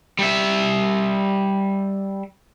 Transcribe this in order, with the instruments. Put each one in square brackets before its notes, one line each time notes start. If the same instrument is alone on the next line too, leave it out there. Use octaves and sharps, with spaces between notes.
[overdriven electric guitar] G3 E5